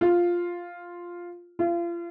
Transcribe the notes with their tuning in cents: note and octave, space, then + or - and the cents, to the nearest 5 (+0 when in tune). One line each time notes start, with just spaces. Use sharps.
F4 +0
F4 -35